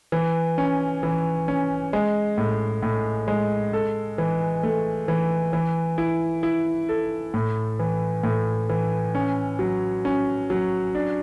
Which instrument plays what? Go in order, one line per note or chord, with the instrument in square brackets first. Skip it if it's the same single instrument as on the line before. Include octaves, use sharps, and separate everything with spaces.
[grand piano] E3
C#4
E3
C#4
G#3
A2
A2
G#3
A4
E3
A3
E3
E3
E4
E4
A4
A2
E3
A2
E3
C#4
F#3
C#4
F#3
D4